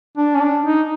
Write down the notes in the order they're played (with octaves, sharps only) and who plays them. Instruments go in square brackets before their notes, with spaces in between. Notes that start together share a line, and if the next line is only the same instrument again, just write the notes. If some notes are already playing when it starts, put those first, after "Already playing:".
[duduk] D4
C#4
D4
D#4